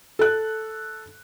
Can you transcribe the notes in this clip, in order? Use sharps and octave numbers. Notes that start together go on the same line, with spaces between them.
A4 F#6